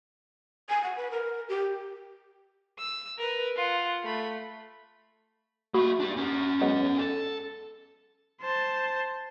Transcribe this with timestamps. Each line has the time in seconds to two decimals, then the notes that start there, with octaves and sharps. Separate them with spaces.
0.69 G#5
0.83 F#5
0.97 B4
1.11 A#4
1.49 G4
2.79 E6
3.18 A#4 B4
3.56 F4 F#5
4.04 A3 B5
5.74 A#3 F#4 E5 B5 D#6
6.00 D4 G4
6.17 C#4 A#4
6.61 F#3 G#3 B3
6.99 A4
8.41 C5 A5